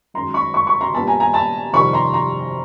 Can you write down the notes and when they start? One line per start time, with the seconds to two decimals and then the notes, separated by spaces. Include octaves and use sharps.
0.14 F#2 D#3 G#3 A#5 C6
0.34 B5 C#6
0.54 B5 C#6
0.67 B5 C#6
0.81 A#5 C6
0.94 A#2 G3 B3 A5 B5
1.07 G#5 A#5
1.20 G#5 A#5
1.33 A5 B5
1.73 F2 C3 D#3 G3 B5 C#6
1.93 A#5 C6
2.14 A#5 C6